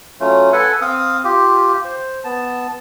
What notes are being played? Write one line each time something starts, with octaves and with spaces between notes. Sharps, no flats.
F#3 A3 C#4 F4
A4 B4 F#5 G#5
C4 F5 D#6
F4 G4
C5
B3 A5